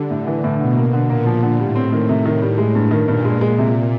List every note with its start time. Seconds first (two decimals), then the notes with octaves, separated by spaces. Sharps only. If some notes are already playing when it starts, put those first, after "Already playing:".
Already playing: D3 G3
0.10 A2
0.27 E3
0.44 A2
0.59 B2 D3
0.76 A#3
0.93 D3
1.09 A#2 A#3
1.26 F3
1.43 D3
1.59 A2 G3
1.76 C4
1.93 D#3
2.09 C3
2.25 D#3
2.42 G3
2.58 G#3
2.75 G2
2.91 D#3
3.08 G2 A#2
3.25 G#3
3.41 G#3
3.58 C3